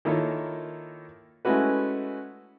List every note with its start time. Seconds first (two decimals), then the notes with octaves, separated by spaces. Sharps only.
0.05 D#3 A#3 E4 F4 A4 C#5
1.45 G#3 A3 C#4 E4 F#4 B4